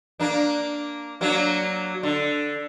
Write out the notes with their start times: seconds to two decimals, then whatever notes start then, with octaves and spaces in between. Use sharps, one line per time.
0.20 A#3 D4
1.21 F#3 A#3 D4
2.03 D3